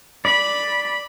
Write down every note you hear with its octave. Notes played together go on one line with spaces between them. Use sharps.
D5 B5